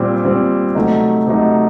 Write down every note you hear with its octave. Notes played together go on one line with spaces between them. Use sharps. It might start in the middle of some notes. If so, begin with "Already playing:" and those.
Already playing: A#2 G3 C4
A#2 G3 C4
C3 F#3 A3 D#4
C3 F#3 A3 D#4